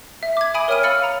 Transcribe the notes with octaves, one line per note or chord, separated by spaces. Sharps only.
E5
D6 G#6
E5 G#5 B5 D#6 D7 D#7
A#4 C#5 G5 F6 D7 D#7
F5 B5 E6 F6 A6 C#7
A#5